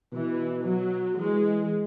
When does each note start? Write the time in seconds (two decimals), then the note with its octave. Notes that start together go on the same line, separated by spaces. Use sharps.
0.12 B2 E3
0.65 F#3
1.18 E3 G#3